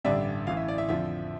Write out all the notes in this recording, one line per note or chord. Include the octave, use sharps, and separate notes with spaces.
A1 G2 D3 G3 D4 E5
A1 A2 E3 F5
E5
D5
E5
F2 D3 F3 E5